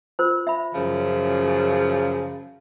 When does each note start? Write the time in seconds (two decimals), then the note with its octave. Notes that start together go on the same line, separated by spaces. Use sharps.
0.19 F4 A#4 C5
0.47 E5 B5
0.75 F#2 C#3 F3